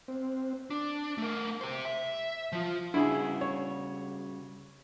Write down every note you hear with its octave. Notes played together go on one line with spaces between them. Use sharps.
C4
D4
A3 A#4
G4 C5
E5
F3 F4
C#3 G3 D4 E4 F#4 G#4
C#5